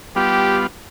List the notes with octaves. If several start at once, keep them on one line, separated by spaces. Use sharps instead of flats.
G3 B3 F4 G4